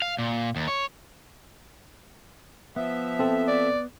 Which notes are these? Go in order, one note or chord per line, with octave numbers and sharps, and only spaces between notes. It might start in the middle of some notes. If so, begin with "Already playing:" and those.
F5
A#2
D#2
C#5
F3 B3 E5
C4 A4
D5